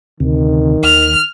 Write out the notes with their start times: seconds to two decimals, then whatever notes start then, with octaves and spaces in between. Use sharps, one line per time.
0.20 D2 C3 D#3
0.83 D#2 F6